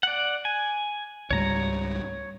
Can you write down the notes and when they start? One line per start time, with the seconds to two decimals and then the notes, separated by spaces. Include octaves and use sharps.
0.03 D5 F#5
0.45 G#5
1.31 C#2 G#2 G3 C#5 A#5